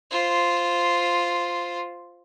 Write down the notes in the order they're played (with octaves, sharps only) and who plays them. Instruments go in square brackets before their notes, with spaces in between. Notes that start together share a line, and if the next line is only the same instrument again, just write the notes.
[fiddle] F4 C5